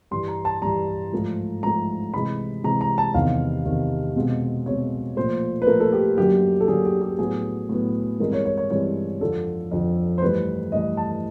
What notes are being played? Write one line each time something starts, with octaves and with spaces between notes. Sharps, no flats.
G2 E3 G3 C6
A#5
A5
G2 E3 G3 A#5
G#2 F3 A3
G#2 F3 A3 A#5
C3 E3 G#3 C4 B5
C3 E3 G#3 C4 A#5
A#5
A5
E2 C3 D#3 F5
E2 C3 D#3
B2 G#3 C4
B2 G#3 C4 C#5
A#2 F3 A3 C5
B4
A#2 F3 A3 A#4
A4
G4
F#2 D3 F#3 A#3 G4
A4
F#2 D3 F#3 A#3 G#4
G4
G4
A2 F#3 B3 G#4
A2 F#3 B3
G2 E3 G#3 C4 A#4
C#5
C#5
C#5
G2 E3 G#3 C4 C#5
F2 D3 F3 A4
F2 D3 F3
C5
G2 E3 A3 B4
G2 E3 A3 D#5
A5